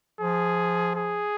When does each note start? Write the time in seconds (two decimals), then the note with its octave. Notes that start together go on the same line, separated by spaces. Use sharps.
0.20 F3 G#4
0.96 G#4